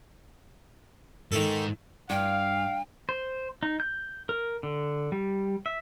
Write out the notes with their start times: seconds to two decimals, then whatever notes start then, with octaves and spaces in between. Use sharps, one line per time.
1.32 G#2 D#3 A4
2.10 G2 F5 G5
3.09 C5
3.63 D#4
3.80 G6
4.29 A#4
4.63 D3
5.12 G3
5.66 E5